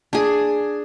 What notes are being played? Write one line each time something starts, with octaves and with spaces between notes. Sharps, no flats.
D4 G#4